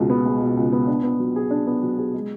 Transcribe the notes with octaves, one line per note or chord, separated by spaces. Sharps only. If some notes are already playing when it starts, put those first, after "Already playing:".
Already playing: C#2 B2 G#3
B3
G#3
B2
C#2
B3
D4
B3
F#3
G#4
D4
B3
F#3
G#4
G#3